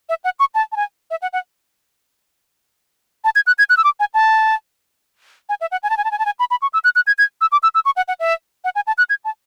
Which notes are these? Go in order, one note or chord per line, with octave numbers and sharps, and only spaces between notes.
E5
F#5
C#6
A5
A5
G#5
E5
F#5
F#5
A5
G#6
F#6
G#6
F#6
E6
D6
G#5
A5
G#5
E5
F#5
G#5
A5
G#5
A5
G#5
A5
G#5
B5
B5
C#6
E6
F#6
F#6
G#6
G#6
E6
D6
E6
E6
C#6
F#5
F#5
E5
F#5
G#5
A5
F#6
G#6
A5